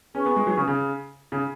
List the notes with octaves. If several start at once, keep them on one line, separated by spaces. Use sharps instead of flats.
C#4 G#4 B4 G#5 C#6
B3
G#3
F#3
C#3
C#3
C#3